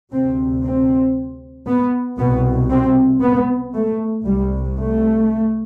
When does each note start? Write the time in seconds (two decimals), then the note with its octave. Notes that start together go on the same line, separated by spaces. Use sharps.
0.11 D2 C3 C4
0.64 C4
1.67 B3
2.18 C2 B2 B3
2.70 C4
3.22 B3
3.74 A3
4.25 C2 C3 G3
4.77 A3